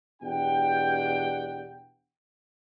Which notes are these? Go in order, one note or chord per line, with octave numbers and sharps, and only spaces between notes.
E2 B2 D4 G4 F#5 G5